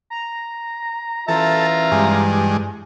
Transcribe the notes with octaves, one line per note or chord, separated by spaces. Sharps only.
A#5
E3 F4 A4 E5 A#5
G2 G#3